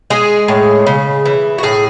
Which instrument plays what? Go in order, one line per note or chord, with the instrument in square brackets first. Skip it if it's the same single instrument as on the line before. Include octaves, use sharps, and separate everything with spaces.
[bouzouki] G#3 G#4
A2
C#3
E3
F#4
A2 G#4